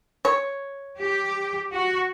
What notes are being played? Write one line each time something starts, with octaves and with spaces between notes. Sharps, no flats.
C#5
G4
F#4